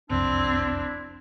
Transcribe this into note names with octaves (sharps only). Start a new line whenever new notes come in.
F#1 C2 F2 C4 D4 E4